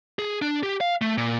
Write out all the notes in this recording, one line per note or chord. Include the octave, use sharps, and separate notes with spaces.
G#4
D4
G4
F5
A3
A#2